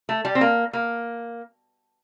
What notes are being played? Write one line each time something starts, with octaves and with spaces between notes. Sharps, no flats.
A3
G3
C4
A#3
A#3